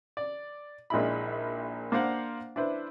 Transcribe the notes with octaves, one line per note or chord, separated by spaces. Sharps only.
D5
A#1 A#2 G#3 D#4 E4 B5
A#3 D4 C5 F5 F#5
D4 E4 B4 C5